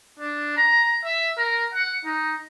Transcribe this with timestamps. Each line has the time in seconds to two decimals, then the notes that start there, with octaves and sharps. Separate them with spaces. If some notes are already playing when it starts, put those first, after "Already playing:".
0.19 D4
0.57 A#5
1.05 E5
1.38 A#4
1.74 F#5
2.05 D#4